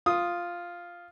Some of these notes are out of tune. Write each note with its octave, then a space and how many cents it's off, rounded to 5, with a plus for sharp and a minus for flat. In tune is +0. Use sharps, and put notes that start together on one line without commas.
F4 +0 D#6 +0